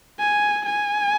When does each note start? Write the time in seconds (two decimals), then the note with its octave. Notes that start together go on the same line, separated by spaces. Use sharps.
0.19 G#5
0.66 G#5